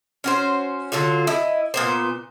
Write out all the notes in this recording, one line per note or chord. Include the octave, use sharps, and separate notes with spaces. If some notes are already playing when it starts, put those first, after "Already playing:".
C#4 F#4 C5
D3 F#3 F4 F#4
E4 D#5
A#2 B3 C5